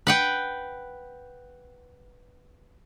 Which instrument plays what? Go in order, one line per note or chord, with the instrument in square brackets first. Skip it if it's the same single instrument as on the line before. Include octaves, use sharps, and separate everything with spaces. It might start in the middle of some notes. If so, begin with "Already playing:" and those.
[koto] B4 F#5 G5